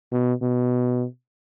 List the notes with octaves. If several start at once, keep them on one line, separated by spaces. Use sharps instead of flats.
B2
B2